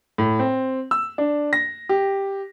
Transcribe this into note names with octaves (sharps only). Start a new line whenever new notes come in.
A2
C4
E6
D4
A#6
G4